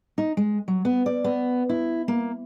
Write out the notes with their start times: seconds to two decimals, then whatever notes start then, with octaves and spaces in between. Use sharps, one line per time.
0.18 D#4
0.37 G#3
0.68 F#3
0.85 B3
1.06 D5
1.24 B3
1.69 E4
2.08 A#3